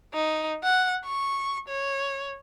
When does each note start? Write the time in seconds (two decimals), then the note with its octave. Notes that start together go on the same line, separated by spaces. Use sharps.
0.14 D#4
0.64 F#5
1.05 C#6
1.69 C#5